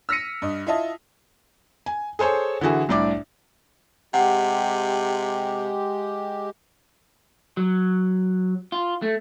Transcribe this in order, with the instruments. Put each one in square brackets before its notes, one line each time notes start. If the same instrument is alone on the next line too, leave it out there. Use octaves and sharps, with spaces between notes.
[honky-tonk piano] E6 F6 A#6 B6 C#7 D#7
G2 D#5
E4 F4 D#5 E5 A5
[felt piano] G#5
G#4 A4 C5 C#5 G#5
D3 E3 E4 F#4 G#4
C2 A2 D4 E4 D5 D6
[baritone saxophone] C3 [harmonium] G#3 G4 [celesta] F#5
[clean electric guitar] F#3
F4
A3